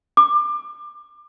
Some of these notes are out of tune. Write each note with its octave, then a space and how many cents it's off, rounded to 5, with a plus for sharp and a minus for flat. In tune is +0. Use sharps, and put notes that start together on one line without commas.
D6 +25